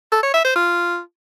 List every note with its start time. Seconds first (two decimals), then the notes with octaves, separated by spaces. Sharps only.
0.12 A4
0.23 C#5
0.34 E5
0.45 C5
0.56 F4